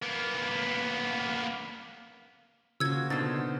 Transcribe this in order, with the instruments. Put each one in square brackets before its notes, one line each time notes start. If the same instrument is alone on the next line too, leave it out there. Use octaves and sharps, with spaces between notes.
[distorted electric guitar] A#3 B3
[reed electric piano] C#3 [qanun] F3 A#3 F#4 [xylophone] E6 G#6
[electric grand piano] B2 D3 [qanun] D#4 F#4 C5 [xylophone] A6